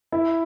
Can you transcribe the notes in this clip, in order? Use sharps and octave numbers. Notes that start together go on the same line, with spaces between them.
E4